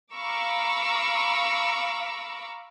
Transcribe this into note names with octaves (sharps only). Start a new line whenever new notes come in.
F5 A#5 B5 C#6 D6 E6